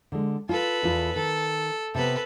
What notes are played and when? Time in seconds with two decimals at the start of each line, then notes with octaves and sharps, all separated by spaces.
0.12 D3 G#3
0.49 F4 A4 B4
0.83 E2 F4
1.16 D#3 A4
1.95 C3 B3 A4 B4